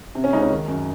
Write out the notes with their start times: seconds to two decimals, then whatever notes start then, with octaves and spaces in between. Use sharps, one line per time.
0.15 C3
0.24 C#4
0.33 C#2 D#4
0.42 C#4
0.51 D#3
0.68 F#2